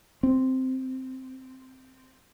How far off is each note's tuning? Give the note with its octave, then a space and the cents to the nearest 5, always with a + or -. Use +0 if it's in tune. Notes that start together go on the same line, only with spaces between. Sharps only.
C4 -5